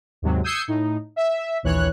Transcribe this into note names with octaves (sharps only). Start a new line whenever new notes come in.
D#2 G#2 C3 F#3
D#6 E6 G6 G#6 C7 C#7
A2 D#4
E5
A#1 D#2 E3 C#5 F#6